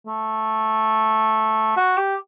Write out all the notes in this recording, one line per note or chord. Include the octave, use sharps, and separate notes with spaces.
A3
F#4
G4